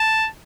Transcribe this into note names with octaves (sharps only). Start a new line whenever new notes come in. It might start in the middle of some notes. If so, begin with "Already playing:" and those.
Already playing: A5